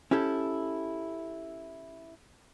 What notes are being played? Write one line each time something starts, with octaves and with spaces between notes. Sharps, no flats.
C#4 E4 G4 A4